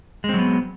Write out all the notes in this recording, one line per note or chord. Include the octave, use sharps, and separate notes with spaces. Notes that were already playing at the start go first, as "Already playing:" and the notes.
F#3 G#3 B3 C4